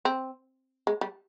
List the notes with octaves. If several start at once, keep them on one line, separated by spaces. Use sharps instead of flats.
C4
G#3
G3